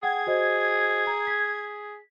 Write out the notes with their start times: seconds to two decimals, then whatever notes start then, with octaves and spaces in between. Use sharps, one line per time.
0.03 G#4 F#5 G5 G#6
0.27 F#4 C5 D#5
1.07 A#5
1.27 B6